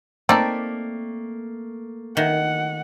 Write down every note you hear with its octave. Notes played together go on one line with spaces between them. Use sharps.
A3 A#3 C4 D#4 A4 D5
D#3 F#5